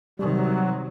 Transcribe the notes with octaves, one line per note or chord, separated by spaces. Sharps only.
C3 D#3 F#3 G3